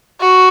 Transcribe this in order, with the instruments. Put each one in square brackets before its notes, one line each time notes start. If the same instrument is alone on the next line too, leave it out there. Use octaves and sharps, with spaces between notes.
[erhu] F#4